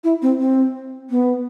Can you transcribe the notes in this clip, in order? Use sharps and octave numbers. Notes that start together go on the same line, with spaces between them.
E4
C4
C4
B3